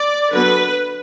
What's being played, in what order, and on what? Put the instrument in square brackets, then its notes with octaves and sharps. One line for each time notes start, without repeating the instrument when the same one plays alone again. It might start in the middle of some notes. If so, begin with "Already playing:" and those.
Already playing: [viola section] D5
D3 F#3 B3 B4